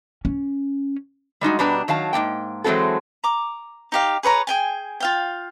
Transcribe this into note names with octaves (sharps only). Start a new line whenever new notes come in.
C#4
G3 G#3 D#4 F#4
B2 G3 D4 B4 A#5
D#3 F#3 F5 A5
G#2 B2 A#3 G5
E3 F#3 G#3 C4 F#4 A4
A#5 D6
D#4 G4 F5
G#4 B4 C#5 A#5
G#4 G5 G#5
F4 F5 G5